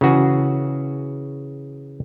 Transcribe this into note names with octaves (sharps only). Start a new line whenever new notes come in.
C#3 E3 F#4 G#4